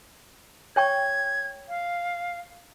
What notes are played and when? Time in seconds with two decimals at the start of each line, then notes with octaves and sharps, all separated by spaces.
0.76 C#5 G5 C#6 G#6
1.69 F5